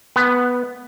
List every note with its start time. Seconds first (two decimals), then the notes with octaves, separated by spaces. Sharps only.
0.16 B3